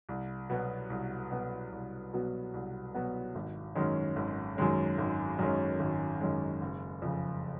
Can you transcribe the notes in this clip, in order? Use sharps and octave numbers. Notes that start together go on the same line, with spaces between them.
C2
B2 F#3 B3
C2
B2 F#3 B3
C2
B2 F#3 B3
C2
B2 F#3 B3
G#1
F#2 D#3 G#3 C#4
G#1
F#2 D#3 G#3 C#4
G#1
F#2 D#3 G#3 C#4
G#1
F#2 D#3 G#3 C#4
F#1
F2 C#3